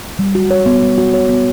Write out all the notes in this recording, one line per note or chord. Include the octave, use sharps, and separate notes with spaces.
G3
F#4
C#5
B3
G3
F#4
C#5
B3